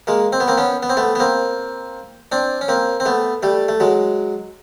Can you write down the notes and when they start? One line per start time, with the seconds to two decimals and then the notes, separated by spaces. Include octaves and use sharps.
0.07 G#3 A#3
0.33 C4
0.40 B3
0.48 A#3 C4
0.57 B3 C#4
0.83 B3
0.90 C4
0.97 A3 B3
1.15 B3
1.20 A#3 C4
2.32 C4 D4
2.61 C#4
2.68 A#3 C4
3.00 C4
3.06 A3 B3
3.43 G3 A3
3.68 A3
3.80 F#3 G#3